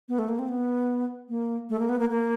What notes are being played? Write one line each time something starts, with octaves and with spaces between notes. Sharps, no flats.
B3
A3
A#3
C4
B3
A#3
A3
A#3
B3
A#3
A#3